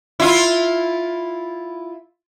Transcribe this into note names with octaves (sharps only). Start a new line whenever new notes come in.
E4 F4